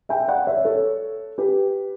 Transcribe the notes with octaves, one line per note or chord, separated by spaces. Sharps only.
E5 G5
D5 F#5
C#5 E5
A4 C#5
G4 B4